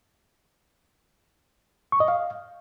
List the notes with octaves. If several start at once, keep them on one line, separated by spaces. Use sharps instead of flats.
C#6
D#5
F5